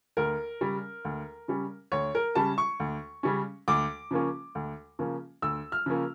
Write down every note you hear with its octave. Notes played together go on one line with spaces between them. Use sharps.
D2 A#4
C#3 G3 C#4
D2
C#3 G3 C#4
D2 C#5
A#4
C#3 G3 C#4 A5
C#6
D2
C#3 G3 C#4
D2 D6
C#3 F3 A#3 C#4
D2
C#3 F3 A#3 C#4
D2 E6
F6
C#3 F3 A#3 C#4